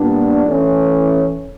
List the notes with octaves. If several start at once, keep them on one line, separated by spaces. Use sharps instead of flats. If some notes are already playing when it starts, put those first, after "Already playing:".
Already playing: A#2 G3 B3 D4
E3 A3 C#4